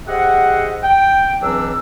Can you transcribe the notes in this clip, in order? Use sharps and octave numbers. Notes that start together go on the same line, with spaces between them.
G4 G#4 C5 D#5 E5 F#5
G5
C#2 E3 F#3 C4 D4 E6